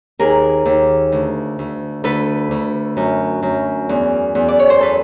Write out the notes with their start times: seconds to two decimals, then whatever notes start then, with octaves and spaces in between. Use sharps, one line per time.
0.19 D#2 G#4 A#4
0.65 D#2
1.12 D2
1.59 D2
2.04 D2 A4 B4
2.51 D2
2.97 F#2
3.42 F#2
3.89 E2
4.35 E2
4.48 D5
4.59 C#5
4.70 C5
4.81 A4 B4